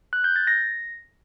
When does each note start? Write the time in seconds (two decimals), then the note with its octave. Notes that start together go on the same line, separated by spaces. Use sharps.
0.13 F#6
0.24 G6
0.36 A6
0.47 A#6